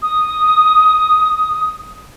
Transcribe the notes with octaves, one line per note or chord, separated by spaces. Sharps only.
D#6